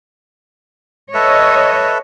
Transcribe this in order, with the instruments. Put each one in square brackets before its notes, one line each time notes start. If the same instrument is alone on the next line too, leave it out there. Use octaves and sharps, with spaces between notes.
[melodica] A4 B4 E5 [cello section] C#5 D#5